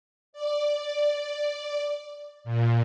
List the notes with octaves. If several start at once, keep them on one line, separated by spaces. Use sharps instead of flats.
D5
A#2